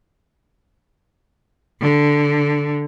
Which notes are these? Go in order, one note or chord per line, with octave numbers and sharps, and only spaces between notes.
D3